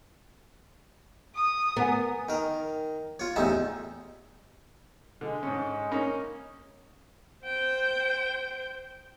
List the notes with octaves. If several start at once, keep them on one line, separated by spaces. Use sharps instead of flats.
D#6
B3 A#4 F#5 G#5
D#3 A#4
F4 C#5
A1 E2 C4 D#4 E5
D3 G#3
G#2 C#4
A#3 C#4 D#4
C5 G5